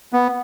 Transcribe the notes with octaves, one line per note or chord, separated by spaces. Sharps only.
B3